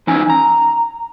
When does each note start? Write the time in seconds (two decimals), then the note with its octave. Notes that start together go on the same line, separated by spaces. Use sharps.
0.07 E3 C#4 D#4 G#5
0.30 A#5